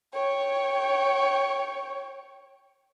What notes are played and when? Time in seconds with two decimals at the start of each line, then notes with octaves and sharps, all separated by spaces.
0.14 C#5 G5